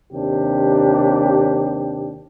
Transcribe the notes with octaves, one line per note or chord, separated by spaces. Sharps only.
D#2 C3 D4 G4